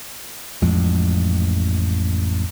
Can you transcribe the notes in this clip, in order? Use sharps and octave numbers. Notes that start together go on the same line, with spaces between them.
A1 F2 F3 G#3